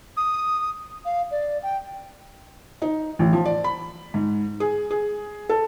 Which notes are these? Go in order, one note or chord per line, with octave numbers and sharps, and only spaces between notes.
D#6
F5
D5
G5
D#4
A1
F3
D5
B5
G#2
G#4
G#4
A4